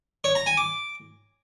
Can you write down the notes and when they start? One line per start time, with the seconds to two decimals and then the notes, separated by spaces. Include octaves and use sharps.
0.24 C#5
0.35 A#5
0.46 G#5
0.57 D6